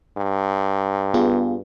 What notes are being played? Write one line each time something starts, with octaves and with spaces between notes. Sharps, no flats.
G2
B3 F4 G#4